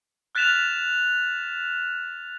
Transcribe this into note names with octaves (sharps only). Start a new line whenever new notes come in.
F6 F#6 A6 B6 E7 F7